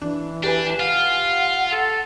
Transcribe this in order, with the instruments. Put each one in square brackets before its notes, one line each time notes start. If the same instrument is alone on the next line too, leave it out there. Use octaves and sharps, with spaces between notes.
[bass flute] E3 [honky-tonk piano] D4
[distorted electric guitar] D4 [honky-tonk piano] G4 B4 G#5
[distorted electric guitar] F4 [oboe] F5 [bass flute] F#5
[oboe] A4